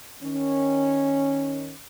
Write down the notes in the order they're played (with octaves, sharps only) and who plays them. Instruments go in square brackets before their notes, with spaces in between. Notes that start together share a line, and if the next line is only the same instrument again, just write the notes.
[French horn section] D#3 C#4